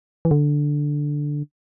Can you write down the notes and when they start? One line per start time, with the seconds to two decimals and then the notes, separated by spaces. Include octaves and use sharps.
0.25 E3
0.31 D3